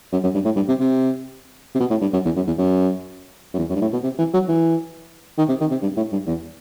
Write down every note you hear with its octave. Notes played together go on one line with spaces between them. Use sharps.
F#2
F#2
G2
A2
G2
C3
C3
C3
B2
A2
G2
F#2
E2
F#2
E2
F#2
F#2
E2
F#2
G2
A2
B2
C3
E3
F#3
E3
D#3
C3
D#3
C3
G2
A2
G2
E2